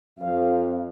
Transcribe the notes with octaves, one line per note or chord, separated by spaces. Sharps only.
F2 F5